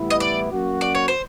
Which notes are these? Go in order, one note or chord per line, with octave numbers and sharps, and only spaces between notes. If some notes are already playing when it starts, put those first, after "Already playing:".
Already playing: A2 E3 G3 B3 E4
D#5
D5
F#3 A#3 C#4 F#4
D5
C#5
C5